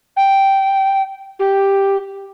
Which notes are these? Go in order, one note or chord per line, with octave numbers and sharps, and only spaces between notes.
G5
G4